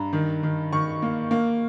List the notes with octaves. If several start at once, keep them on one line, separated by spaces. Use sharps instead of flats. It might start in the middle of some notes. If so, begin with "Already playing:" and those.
Already playing: G2 A#5
D#3
D#3
D#3 C#6
A#3
A#3